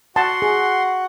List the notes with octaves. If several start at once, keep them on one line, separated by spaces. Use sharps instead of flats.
F#4 F#5 A5 C6
G#4